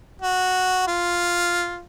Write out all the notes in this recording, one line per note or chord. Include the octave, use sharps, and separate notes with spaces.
F#4
F4